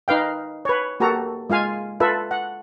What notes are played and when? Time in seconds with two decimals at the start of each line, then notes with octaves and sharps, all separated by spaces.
0.08 D#4 B4 F5 G5
0.65 B4 C#5
1.00 A#3 F#4 G4 A4 A#5
1.50 G#3 F4 F5 G#5
2.00 F4 A4 B4 E5
2.31 F#5